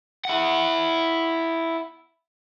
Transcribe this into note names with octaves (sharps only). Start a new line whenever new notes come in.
E4 F#5